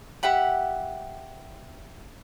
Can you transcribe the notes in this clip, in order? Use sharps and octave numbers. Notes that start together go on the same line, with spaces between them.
G4 E5 F#5 B5